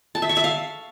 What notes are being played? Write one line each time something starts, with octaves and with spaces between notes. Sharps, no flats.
A5
E5
C#6
E5
F5